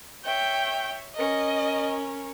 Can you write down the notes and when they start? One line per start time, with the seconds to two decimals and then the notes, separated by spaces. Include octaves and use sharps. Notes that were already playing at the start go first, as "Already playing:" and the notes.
0.25 C#5 E5 G5
1.15 C#4 A#4 D#5